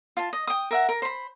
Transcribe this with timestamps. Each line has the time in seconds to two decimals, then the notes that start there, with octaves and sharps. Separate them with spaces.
0.17 F4 A5
0.33 D#5
0.47 G5 D#6
0.71 A#4 E5 F#5
0.89 A#4
1.02 C5 B5